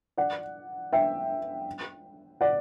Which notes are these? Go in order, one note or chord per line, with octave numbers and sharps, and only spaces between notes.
D5 F#5
E5 G5
D5 F#5